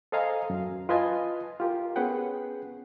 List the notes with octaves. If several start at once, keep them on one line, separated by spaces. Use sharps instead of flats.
A4 C5 D#5 F5 G#5 A#5
F#2
F4 B4 D#5 G#5 A5
F4 G4 A#4
B3 C#4 G#4 B4 F#5 G5